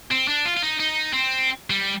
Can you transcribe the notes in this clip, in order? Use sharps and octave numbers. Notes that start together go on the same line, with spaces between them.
C4
D4
F4
F4
D#4
D#4
C4
G3